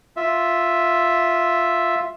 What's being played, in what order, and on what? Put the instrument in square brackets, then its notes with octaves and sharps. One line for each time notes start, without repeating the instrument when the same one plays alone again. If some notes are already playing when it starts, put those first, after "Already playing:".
[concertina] F4 E5